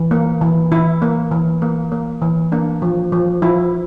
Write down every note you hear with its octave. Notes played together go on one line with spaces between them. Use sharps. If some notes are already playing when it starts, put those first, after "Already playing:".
Already playing: E3
A#3
E3
E3 E4
A#3
E3
A#3
A#3
E3
A#3 D4
F3
F3
F3 E4